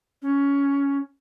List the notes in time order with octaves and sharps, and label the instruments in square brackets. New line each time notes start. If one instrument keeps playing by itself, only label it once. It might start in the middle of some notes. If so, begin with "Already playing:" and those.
[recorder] C#4